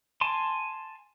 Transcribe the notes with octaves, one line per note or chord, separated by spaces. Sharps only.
G#5 A5 C6